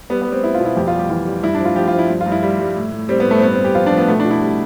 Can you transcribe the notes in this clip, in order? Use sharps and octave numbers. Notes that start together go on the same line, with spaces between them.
G3 B3
B3
G3 C4
G3 E4
F4
B2
E4
F2 G4
F4
G3
G4
E3 F4
G3
G2 E4
D4
F3
F4
F3 G4
F4
F3
E4
G2
F4
G2
E4
G3
G3
A2
A2
G3 C4
B3
A2
A3
C4
G2 B3
C4
G2
G4
F3 F4
D4
F3
B3
B2 A3
D4
B2
E4
G3